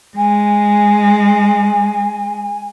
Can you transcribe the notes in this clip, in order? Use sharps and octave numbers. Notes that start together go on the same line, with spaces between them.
G#3 G#5